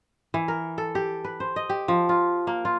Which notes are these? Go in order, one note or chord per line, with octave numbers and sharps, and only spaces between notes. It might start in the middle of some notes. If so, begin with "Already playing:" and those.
E3
A#4
A4
G4
B4
C5
D#5
G4
F3
F4
A#3
F4